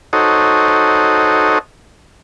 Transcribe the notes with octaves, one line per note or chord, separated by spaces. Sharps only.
D#4 F#4 A4 C5 C#5 D#5